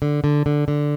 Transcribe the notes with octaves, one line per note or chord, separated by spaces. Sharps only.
D3
D3
D3
D3